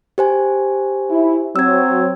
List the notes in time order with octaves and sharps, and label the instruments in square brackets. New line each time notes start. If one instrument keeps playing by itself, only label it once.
[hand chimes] G4 C5 G#5
[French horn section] E4
[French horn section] F#3 C4 [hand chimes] E6 G#6